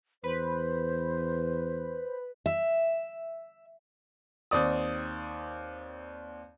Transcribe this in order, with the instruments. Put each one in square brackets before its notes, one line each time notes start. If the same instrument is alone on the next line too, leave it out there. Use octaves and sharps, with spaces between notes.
[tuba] E2 [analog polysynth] B4 [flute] C5
[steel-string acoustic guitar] E5
[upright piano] D#2 C4 D5 D#6